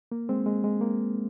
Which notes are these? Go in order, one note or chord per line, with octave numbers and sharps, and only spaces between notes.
A#3
G#3 C4
G#3
G#3
A#3